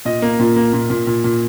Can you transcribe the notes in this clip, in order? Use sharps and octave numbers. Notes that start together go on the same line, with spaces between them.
A#2 D#5
A#3
A#2
A#3
A#2
A#2
A#2
A#2